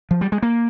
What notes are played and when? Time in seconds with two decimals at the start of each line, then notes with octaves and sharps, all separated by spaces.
0.11 F3
0.21 G3
0.32 G#3
0.42 A#3